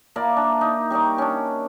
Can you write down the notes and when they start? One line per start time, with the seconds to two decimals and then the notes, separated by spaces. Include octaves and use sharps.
0.16 A#3 E4 D5
0.37 D4
0.61 D#4
0.90 G3 D#4 D5 C#6
1.18 C#4 D4